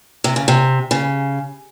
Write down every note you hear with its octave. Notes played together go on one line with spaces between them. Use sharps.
C3
C#3
C3
C#3